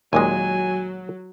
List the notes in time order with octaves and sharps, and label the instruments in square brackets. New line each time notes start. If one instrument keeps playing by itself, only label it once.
[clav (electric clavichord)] D#2 A#2 G#3 [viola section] F#3 [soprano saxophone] G#5